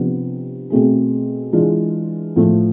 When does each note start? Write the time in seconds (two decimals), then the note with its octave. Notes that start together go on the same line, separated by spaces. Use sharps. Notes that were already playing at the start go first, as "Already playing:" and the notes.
Already playing: C3 F3 B3 D4
0.70 B2 A3 C4 G#4
1.53 E3 G#3 D4 F4
2.36 A2 F3 A3